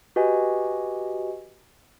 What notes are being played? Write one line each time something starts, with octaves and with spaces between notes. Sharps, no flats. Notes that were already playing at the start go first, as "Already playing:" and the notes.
F#4 G4 B4 D#5 G#5